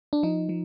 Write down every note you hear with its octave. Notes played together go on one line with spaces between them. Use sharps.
D4
F3 D#4
F3